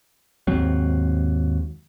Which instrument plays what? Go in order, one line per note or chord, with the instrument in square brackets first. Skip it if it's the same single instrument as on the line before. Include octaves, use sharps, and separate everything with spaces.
[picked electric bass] D#2 G#2 F#3 C4